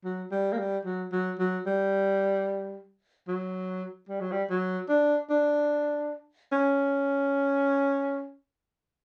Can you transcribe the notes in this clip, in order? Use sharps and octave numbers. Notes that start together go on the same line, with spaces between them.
F#3
G3
A#3
G3
F#3
F#3
F#3
G3
F#3
G3
F#3
G3
F#3
D4
D4
C#4